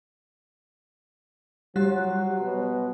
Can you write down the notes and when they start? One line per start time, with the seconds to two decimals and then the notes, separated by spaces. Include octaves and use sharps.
1.76 F#3 G3 G4 F#6
2.41 B2